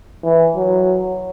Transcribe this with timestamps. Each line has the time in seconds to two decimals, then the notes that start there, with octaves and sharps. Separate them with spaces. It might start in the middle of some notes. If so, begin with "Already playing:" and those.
0.24 E3
0.56 F#3